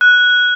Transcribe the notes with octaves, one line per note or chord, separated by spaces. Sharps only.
F#6